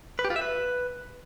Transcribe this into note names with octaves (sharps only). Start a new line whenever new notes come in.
B4
G4
F4
E5
B4